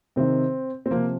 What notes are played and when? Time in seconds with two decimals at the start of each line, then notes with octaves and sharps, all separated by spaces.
0.16 C3 D#3 C4
0.86 C4
0.91 C3 F3 A#3